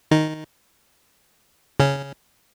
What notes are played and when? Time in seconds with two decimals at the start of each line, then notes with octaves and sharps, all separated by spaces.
0.11 D#3 D#4
1.80 C#3 C#4